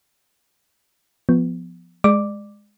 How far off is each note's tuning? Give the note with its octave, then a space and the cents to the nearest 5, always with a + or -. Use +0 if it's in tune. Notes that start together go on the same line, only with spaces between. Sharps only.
F3 +0 B3 +0
G#3 +0 D5 +25 D6 +0